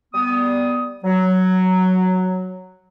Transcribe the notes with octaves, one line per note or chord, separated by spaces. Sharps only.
G3 B3 D#6
F#3